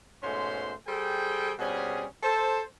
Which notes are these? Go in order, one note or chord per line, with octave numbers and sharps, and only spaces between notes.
G#2 B2 A3 C#4 C5 C6
G3 G#4 A4 C5 G5
B2 G3 C4 C#4 G#4
A4 C5 A5